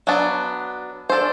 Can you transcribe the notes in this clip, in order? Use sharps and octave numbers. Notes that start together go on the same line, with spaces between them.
F#3 B3 D4
D4 A4 C5